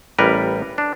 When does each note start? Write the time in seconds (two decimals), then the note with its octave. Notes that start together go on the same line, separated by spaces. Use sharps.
0.19 A1 G3 A#4 B4
0.78 D4